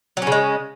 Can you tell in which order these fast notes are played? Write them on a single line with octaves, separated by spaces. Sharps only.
F#3 C#4 C#3 G#3